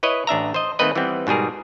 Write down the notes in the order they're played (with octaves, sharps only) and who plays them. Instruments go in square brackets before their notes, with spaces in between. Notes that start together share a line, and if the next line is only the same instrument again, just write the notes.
[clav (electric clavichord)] E4 B4 C#5 D#5
A1 D4 E5 A#5
C5 D#5
D#3 A3 A#3 C4 B4 D#5
E3 G3 B3 C4
G#2 B2 G3 G#4 A#4